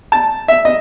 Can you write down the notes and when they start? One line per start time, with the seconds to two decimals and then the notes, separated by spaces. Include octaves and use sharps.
0.12 A5
0.48 E5
0.65 D#5